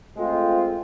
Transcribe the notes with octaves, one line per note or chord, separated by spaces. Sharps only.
G#3 A3 C4 F4